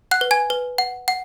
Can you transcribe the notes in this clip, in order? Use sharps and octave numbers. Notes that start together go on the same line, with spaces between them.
F#5 F#6
B4
G#5 G#6
B4
F#5
F#5